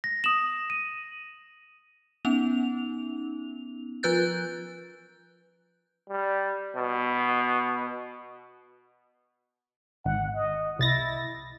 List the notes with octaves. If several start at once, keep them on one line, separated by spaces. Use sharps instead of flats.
A#6
D#6 E7 F#7
D#7
B3 C#4 D#4 F7
F3 F4 B4 F#6 G6 A6
G3
B2
G#1 F#5
D#5
C2 E4 A6 A#6